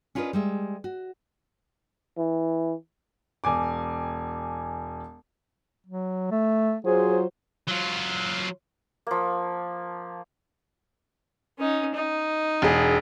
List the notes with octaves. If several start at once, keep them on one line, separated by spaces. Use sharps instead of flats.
C#4 D4 F4 A#4 B4 D#5
G3 G#3 E5
F#4
E3
E1 G#5 D6
F#3
A3
F#3 F4 G#4 C5
F#3 F4
F3 A#3
C#4 D#4
D#4
E1 G#4